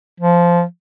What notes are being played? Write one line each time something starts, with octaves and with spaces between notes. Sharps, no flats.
F3